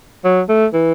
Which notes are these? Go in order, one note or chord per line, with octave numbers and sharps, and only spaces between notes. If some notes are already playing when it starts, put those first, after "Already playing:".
F#3
A3
E3